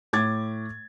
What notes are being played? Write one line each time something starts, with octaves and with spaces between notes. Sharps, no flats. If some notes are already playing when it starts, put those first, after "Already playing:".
A2 D6 G#6 A6